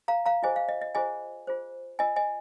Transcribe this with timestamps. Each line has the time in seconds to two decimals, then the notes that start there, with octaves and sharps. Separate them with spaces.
0.08 F5 A#5
0.26 F5 A#5
0.43 F4 G#4 C5 D#5 G#5
0.56 F5
0.69 D#5
0.82 D#5
0.95 F4 G#4 C5 D#5 G#5
1.47 F4 G#4 C5
1.99 F4 A#4 D#5 G#5
2.16 D#5 G#5